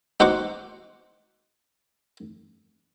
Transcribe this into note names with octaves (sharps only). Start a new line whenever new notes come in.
D#4 F#4 C5 C#6 D6